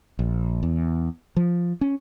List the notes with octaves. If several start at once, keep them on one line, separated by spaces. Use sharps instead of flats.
A#1
E2
F3
C#4